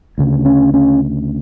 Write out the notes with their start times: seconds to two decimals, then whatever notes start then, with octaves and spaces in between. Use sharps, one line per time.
0.18 D2 C#3
0.45 C#4
0.74 C#4